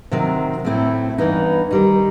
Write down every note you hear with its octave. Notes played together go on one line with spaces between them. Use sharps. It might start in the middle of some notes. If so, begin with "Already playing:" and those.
C3 D#3 F#3 C4
A2 F#3 A3 C4 E4
G2 E3 B3 D#4
D#3 G3 D#4